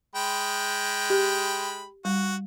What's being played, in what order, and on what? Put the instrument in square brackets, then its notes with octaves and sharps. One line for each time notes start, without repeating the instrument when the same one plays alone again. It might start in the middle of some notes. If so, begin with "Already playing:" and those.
[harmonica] G#3 G5 B5
[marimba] G4
[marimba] G3 [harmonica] F#4